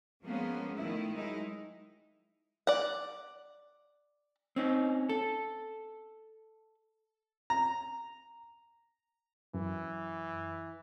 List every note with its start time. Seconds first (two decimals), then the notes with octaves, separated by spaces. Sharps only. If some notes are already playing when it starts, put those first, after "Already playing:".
0.23 F3 G#3 A#3 B3 C#4
0.77 D#3 F3 A3 E4
1.13 F#3 G#3 D#4 E4
2.67 D5 F#5
4.56 C4 C#4 D#4
5.09 A4
7.50 A#5
9.54 F#2 E3